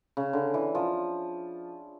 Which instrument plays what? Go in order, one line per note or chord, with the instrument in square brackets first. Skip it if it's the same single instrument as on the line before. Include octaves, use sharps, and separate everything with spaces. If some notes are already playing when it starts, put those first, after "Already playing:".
[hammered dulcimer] C#3
D3
E3
F3